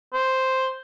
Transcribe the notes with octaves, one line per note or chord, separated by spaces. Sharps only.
C5